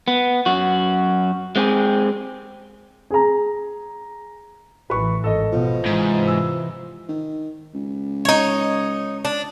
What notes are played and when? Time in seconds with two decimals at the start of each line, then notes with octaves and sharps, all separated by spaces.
0.08 B3
0.46 F#2 F#4
1.56 G#3 C4 G4 G#4
3.10 G#4 A#5
4.90 A1 E3 B4 C#6
5.24 G#1 A4 D#5
5.52 B2 F3
5.86 G#2 C3 E3
6.28 E6
7.09 D#3
7.74 C#2
8.25 D#4 C#5
9.25 D4